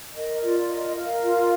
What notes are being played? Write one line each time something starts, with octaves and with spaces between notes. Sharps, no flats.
A#4 D#5
F4 D5
A#4 D#5
A#4 F5
F4